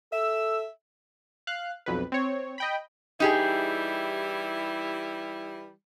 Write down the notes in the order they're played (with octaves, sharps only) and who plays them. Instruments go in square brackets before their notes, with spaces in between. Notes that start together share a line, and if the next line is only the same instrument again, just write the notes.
[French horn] A4 [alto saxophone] E5 [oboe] E6
[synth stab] F5 F#6
B1 F2 B4
C4 C#5
D#5 G5 B5
[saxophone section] E3 G3 E4 [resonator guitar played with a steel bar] D#4 G4 G#4